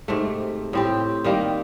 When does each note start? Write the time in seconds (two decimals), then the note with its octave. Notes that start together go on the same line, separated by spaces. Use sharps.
0.08 G#2 C3 A3
0.73 A2 C4 G4
1.24 D#3 G3 A#3